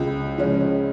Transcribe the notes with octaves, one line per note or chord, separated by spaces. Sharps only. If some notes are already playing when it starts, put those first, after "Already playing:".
Already playing: C#2 C#3 F3 C#4
C#3 F3 G#3 C#4